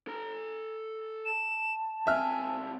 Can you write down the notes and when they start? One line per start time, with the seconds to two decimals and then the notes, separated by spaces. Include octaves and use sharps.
0.07 A4 A#5
1.25 A5 E7
2.07 C#2 C4 E5 G#5 F6